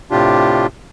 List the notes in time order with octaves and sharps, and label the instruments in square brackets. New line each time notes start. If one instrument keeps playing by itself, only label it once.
[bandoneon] A2 C3 D4 F4 G4